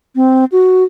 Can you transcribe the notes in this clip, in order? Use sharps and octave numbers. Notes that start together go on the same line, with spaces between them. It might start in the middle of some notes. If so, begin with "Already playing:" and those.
C4
F#4